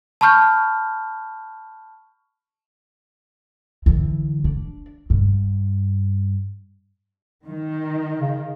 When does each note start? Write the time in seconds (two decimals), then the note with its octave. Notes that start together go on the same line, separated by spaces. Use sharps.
0.21 A5 B5 C#6 F6 G6
3.86 D3 E3
4.44 D4
5.10 G2
7.46 D#3
8.20 C#3